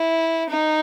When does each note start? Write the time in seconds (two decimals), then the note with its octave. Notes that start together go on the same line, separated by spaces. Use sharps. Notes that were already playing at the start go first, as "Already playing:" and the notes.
Already playing: E4
0.49 D#4